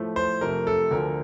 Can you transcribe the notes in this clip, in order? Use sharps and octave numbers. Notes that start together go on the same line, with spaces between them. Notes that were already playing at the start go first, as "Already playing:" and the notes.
Already playing: A2 F3 A3
C5
F2 C3 F3 A3 A#4
A4
D2 D3 F3 A#4